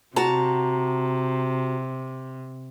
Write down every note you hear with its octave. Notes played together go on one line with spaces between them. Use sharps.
C3 F#4 A5 A#5